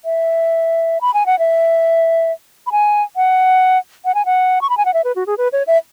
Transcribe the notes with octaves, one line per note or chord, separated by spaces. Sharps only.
E5
B5
G#5
F#5
E5
B5
G#5
F#5
F#5
G#5
F#5
C#6
B5
G#5
F#5
E5
B4
F#4
G#4
B4
C#5
E5